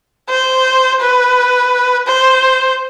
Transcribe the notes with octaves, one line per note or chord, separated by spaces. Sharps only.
C5
B4
C5